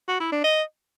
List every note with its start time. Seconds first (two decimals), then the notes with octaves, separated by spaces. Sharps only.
0.08 F#4
0.20 E4
0.32 D4
0.44 D#5